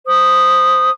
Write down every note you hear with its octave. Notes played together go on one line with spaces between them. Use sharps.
C5 D#6